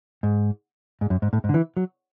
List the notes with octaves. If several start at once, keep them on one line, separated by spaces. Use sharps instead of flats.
G#2
G#2
F#2
G#2
A2
G#2
D3
E3
F#3